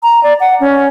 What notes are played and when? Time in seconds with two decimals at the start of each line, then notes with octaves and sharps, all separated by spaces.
0.03 A#5
0.23 D5
0.40 F#5
0.60 C#4